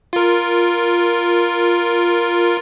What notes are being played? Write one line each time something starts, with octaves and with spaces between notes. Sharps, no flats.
F4 A#4